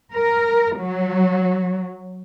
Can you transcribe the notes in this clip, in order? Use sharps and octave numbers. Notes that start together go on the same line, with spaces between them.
A#4
F#3